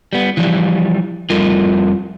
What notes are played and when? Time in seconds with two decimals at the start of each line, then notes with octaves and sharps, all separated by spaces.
0.13 G3 B3
0.37 E3 F3 G3
1.30 F2 G3 A3 F4 A#4